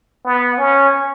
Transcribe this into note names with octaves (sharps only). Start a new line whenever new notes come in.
B3
C#4